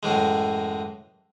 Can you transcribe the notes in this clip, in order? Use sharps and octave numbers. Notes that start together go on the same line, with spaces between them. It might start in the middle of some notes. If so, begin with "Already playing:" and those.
F#2 A2 E3 G#3